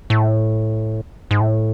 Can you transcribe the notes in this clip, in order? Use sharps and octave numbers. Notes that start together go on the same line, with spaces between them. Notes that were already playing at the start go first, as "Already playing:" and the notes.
A2
G#2
A2